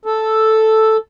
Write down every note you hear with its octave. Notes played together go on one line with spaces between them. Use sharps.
A4